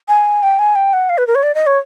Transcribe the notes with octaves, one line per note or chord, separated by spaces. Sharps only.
G#5
G5
G#5
G5
F#5
F5
B4
A#4
C#5
D5
D#5
C#5